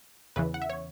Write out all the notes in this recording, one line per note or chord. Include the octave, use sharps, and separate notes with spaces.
E2 C#3 E3 B4
F#5
E5
C#5